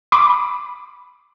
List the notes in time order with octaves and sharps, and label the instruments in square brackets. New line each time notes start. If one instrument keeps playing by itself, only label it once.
[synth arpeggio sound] B5 D6